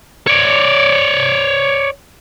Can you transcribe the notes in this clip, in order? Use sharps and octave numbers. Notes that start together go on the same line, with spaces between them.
C#5 D5